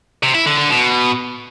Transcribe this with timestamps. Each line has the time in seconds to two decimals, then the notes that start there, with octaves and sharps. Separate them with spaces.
0.23 C3
0.35 E4
0.46 D3
0.58 D3
0.70 B2